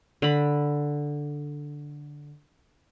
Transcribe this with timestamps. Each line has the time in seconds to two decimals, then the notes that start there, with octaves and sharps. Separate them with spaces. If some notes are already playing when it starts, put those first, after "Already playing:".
0.22 D3 B5